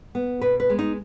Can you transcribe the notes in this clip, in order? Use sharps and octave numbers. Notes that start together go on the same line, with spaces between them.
B3
B2 B4
B4
G#3 B3
D#4